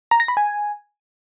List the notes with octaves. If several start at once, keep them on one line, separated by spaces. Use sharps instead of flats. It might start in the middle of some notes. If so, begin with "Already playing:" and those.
A#5
A#6
B5
G#5